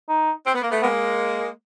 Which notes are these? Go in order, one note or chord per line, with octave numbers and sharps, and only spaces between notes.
D#4
C4
B3
A#3
A3 B3
G#3 A#3 B3